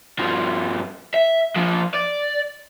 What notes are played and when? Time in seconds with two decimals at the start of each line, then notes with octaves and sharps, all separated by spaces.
0.19 G2 F3
1.14 E5
1.56 F3 D4
1.94 D5